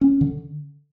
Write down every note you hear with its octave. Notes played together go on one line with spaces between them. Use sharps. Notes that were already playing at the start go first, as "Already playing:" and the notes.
C#4
D3